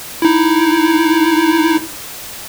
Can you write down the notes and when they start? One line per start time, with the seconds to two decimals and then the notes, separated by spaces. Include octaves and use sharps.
0.22 D#4 E4